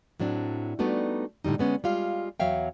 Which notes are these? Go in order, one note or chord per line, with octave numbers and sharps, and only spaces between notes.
A2 F#3 C4 D4
G3 A3 B3 D4 D#4 F#4
A2 D3 G3 D#4
D3 G#3 B3 C#4
G3 G#3 F4 F5
E2 F#3 C#5 E5 F5 G5